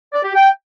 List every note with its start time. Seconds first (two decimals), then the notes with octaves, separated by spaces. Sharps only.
0.13 D5
0.24 G4
0.35 G5